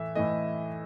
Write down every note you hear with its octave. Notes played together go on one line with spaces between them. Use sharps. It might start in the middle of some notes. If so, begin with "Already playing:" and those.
Already playing: A2 E3 A3 E5
A2 E3 A3 D#5